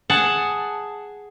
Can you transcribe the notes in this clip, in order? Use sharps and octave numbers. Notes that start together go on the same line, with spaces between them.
G#4 F#5 A5